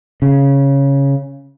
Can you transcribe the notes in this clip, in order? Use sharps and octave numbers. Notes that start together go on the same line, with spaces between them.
C#3